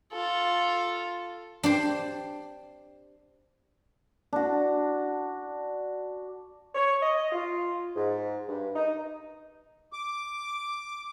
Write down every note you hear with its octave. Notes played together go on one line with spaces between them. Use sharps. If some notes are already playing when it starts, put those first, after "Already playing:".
F4 A4
D4 G4 C5
D4 F#4
C#5
D#5
F4
G#2
G2
D#4
D6